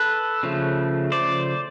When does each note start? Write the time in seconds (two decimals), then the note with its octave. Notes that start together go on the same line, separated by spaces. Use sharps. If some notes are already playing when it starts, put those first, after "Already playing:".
Already playing: A4 B4
0.43 C#3 F3 A3
1.12 C5 D5